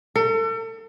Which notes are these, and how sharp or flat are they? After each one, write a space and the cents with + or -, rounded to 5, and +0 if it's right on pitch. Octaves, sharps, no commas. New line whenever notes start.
A4 +40